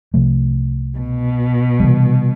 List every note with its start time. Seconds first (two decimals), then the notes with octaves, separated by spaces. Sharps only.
0.14 C2 C3 F3 A3
0.97 B2
1.80 C3 E3 G3